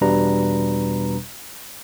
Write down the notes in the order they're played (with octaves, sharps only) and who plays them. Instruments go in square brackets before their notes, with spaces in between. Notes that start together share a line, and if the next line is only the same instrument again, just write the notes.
[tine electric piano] E2 B2 G3 D4 B4 A#5